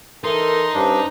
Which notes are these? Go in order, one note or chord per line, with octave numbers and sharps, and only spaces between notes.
E3 D#4 A4 A#4 C6
G2 C#4 D4 C5